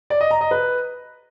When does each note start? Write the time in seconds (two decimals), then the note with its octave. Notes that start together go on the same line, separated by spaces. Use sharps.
0.10 D5
0.21 D#5
0.31 A#5
0.41 D#5
0.51 B4